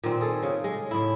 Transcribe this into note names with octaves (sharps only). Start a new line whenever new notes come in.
A#2 D#3 C4
G#4 A4
C#3
G#3
A2 E4